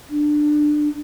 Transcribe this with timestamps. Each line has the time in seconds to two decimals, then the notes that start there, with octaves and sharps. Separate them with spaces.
0.10 D4